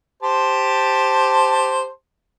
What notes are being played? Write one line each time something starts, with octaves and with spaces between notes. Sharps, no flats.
G4 C5 A5